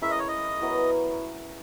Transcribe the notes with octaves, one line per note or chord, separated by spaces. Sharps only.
G#3 C#4 E4 A#4 E5
D#5
C#5
D#5
F#3 B3 E4 A#4